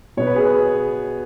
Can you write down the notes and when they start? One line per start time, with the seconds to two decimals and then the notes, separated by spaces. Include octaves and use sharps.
0.17 B2 B3 C#5
0.27 B4
0.36 G#4
0.45 B4